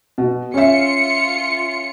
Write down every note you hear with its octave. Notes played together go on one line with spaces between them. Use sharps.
B2
C#4 F4 E5 C#7